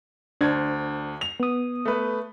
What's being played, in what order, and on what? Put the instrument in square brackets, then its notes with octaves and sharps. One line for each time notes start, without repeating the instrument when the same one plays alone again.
[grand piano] D2 C5 G#6 [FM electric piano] D4
[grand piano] F7
[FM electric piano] B3 D#6
[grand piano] A3 B4